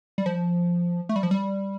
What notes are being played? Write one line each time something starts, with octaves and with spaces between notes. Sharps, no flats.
G3
F3
A3
G3
F3
G3